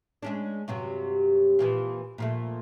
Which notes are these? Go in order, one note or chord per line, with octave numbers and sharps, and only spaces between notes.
G#3 C#4 D4
G2 C3 F#3
A#2 E3 F3
A#2 F3 A3